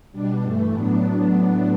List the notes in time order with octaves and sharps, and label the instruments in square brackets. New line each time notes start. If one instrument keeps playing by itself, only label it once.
[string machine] B2 G3 D4
G2 E3 A3
A2 F#3 B3 D4